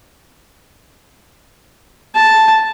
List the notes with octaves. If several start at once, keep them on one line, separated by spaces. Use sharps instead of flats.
A5